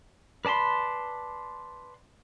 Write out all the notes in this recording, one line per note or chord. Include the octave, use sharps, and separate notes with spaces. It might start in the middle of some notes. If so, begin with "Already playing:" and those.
B4 D5 A5 B5 C6